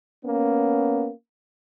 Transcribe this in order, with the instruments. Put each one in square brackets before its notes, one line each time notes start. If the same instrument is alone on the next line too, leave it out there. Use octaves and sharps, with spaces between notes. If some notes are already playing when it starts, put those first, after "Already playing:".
[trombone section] A#3 B3 C#4